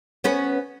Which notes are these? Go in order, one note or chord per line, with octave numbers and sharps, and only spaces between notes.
B3 C#4 B4